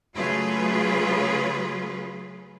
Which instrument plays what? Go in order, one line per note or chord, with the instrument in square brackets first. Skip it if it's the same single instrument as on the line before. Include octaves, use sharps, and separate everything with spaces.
[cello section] C#3 F#3 A3 F4 G#4 B4